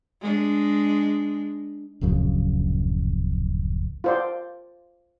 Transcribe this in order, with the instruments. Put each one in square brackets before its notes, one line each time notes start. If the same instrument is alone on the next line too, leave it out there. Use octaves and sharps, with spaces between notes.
[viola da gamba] G#3 D4
[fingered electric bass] D1 A#1 F#2 C#3
[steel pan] F4 C5 D5